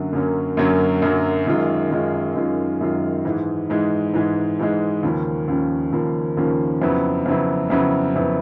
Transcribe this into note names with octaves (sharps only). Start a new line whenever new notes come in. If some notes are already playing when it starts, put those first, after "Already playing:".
Already playing: F#2 D3 F#3 A#3 C#4
F#2 D3 F#3 A#3 C#4
F#2 D3 F#3 A#3 C#4
F#2 D3 F#3 A#3 C#4
F#2 D#3 G#3 C#4 F4
F#2 D#3 G#3 C#4 F4
F#2 D#3 G#3 C#4 F4
F#2 D#3 G#3 C#4 F4
G#2 E3 G#3
G#2 E3 G#3
G#2 E3 G#3
G#2 E3 G#3
D#2 C#3 F3 A#3 C#4
D#2 C#3 F3 A#3 C#4
D#2 C#3 F3 A#3 C#4
D#2 C#3 F3 A#3 C#4
F2 C#3 F#3 B3 E4
F2 C#3 F#3 B3 E4
F2 C#3 F#3 B3 E4
F2 C#3 F#3 B3 E4